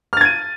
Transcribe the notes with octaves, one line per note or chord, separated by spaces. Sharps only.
F6 G#6 A6 D#7